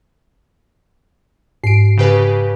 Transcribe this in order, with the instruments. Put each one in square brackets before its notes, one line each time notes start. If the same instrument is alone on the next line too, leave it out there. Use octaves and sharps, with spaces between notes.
[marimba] G#2 [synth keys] C7 D7
[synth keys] C#3 G4 B4